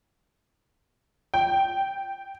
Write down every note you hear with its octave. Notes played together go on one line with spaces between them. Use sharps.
G5